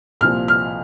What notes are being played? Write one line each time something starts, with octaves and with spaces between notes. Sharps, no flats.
C2 A#2 F3 F6
F6